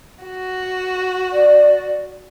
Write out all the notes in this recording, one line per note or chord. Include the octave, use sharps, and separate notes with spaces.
F#4
D5